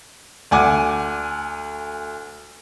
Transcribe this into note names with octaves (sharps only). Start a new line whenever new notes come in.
D2 F#5 G#5 D6